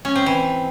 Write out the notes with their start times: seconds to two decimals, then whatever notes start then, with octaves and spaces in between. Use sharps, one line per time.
0.05 C#4
0.16 C4
0.26 E3